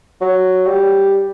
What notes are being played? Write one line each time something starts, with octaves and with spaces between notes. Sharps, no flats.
F#3
G3